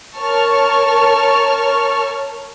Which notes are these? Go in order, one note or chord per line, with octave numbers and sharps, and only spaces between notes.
A#4 C#5 A5 C#6 F6